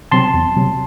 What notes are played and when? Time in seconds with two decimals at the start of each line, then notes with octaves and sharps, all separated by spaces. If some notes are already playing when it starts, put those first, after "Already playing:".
0.12 C3 F#3 C4 A5 C6
0.34 E2
0.57 C3 F#3 C4